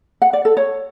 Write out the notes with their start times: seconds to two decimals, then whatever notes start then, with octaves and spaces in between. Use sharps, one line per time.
0.22 F#5
0.33 D5
0.45 A4
0.57 C#5